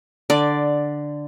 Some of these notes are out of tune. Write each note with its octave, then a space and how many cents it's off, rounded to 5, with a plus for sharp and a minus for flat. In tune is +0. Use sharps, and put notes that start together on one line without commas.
D3 +5 D5 +0